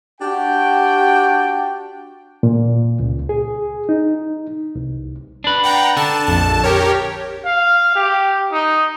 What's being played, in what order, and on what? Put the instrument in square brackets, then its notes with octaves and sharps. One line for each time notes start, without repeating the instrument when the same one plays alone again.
[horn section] D4 F#4 G4 G5
[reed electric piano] A#2
C#2
G#4
D#4
C2
[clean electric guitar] D4 B4
[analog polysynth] F#5 G5 A#5
[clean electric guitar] D3 [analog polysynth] A5
[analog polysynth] A#1 F2 A5
G4 A#4 C#5
[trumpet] F5
G4
D#4